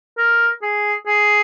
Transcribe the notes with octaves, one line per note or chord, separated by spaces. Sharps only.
A#4
G#4
G#4